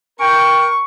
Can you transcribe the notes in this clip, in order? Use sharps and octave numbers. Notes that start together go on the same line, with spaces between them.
A#4 G5 C#6